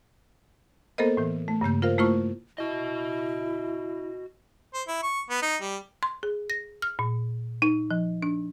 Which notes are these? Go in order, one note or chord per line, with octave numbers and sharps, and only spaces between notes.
A#3 B3 A4 A#4 C5 D#5
A2 E3
A3
G2 C#3 A#3 G6
F4 A#4 C5 F5
A3 A#3 E4 F4 C5 C#6
E4 F#4 D#5
C5
E4
C#6
B3
D#4
G3
C6
G#4
A#6
F6
A#2
D#4
F3
D4